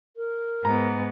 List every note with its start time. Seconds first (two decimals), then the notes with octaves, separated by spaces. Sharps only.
0.17 A#4
0.65 G#2 B3 A#5